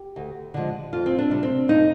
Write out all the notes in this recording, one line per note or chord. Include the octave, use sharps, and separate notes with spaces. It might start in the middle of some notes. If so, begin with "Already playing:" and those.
Already playing: G4
D2
D3 F3 G#3
F2 F4
C4
D4
C3 G3
C4
F2 D#4